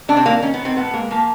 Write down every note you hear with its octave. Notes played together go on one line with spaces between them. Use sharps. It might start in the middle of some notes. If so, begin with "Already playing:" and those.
C3 D4
C4
D#3 A#3
D#3 C#4
B3
D#3
C4
A2 B3
G#3 A#3
F3 A#3